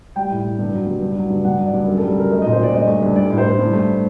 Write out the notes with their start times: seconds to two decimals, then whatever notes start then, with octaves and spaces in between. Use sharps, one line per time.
0.16 G3 G5
0.31 A2
0.45 A2
0.59 G2
0.74 F#3
0.87 G2
1.02 G2
1.17 F#3
1.30 G2
1.44 G2 F#5
1.59 F#3
1.66 D5
1.74 G2
1.88 F#2 A#4
1.98 A4
2.01 G3
2.16 F#2 A#4
2.30 A3 D#5
2.42 D#5
2.45 A#2
2.52 C5
2.59 A#2 D5
2.74 G2 D#5
2.87 A3
3.02 G2
3.16 G3 D5
3.30 A2
3.38 C5
3.45 A2
3.59 G2
3.73 A3